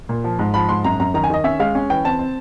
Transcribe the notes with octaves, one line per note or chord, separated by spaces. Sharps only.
A#2
F3
G#2
F3 B5
G#2 C6
F#2 A#5
F#2 A#5
D#3 A#5
G#5
D#3 D#5
C#4 E5
G#3 F5
C#4
E3 G5
C4 A5
C4